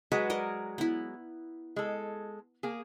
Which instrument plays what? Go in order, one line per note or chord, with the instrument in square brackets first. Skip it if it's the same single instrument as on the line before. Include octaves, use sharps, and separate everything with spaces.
[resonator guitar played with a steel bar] F#3 G#3 F#4 [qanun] B4
[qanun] A#4 D5 D#5
B3 E4
[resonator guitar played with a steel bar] G#3 A4
A#3 G#4